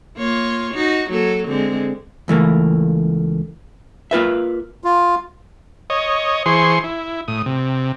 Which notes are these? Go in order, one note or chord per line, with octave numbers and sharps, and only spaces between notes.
A#3 F4 C#5
D#4 F#4
F#3 A#3 A4
D3 G#3 C4
C#2 E3 A3 A#3
A#3 F4 B4 E5
F4
C#5 D#5
E3 G#4 C5 C6 C#6
E4
A2 D#6
C3